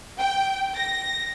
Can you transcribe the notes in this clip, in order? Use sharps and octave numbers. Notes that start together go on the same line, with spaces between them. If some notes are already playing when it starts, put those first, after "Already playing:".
G5
A#6